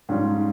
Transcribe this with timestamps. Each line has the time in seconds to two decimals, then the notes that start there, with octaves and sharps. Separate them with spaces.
0.09 G#2 G3 C#4 F4